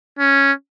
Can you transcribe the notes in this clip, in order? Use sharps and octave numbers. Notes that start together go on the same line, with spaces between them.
C#4